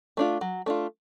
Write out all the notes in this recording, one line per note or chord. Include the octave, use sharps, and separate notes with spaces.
A3 D4 F4
F#3
A3 D4 F4